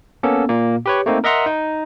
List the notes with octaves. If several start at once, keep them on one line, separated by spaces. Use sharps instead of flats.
A#3 B3 C#4 A4
A#2 A#3
G4 B4 C#5
A3 A#3 C4 D#4
A#4 D#5 E5 F#5 A#5 C6
D#4